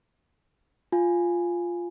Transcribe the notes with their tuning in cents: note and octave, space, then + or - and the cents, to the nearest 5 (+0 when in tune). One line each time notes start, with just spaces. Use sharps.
F4 +0 G#5 +0